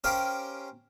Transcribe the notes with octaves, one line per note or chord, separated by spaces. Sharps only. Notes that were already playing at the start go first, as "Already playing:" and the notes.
C#4 G4 A#4 C5 F5 G5